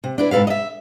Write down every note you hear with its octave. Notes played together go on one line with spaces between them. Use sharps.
C3
D4 E4 B4
G#2 C3 A4 B4 F5
D#5 E5